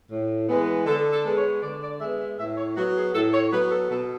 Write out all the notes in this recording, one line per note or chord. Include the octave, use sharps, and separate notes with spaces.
A2
E3 G#3 B3
D3 A4
A4
G#3 B3
C#5
D3 D5
D5
G#3 B3 E5
E5
A2 E5
C#5
F#3 B3 F#4
G#4
A2 A4
C#5
F#3 B3 B4
A4
B2 A4